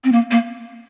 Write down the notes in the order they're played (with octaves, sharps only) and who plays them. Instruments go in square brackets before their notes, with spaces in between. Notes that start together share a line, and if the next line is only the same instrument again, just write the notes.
[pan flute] C4
A#3
A#3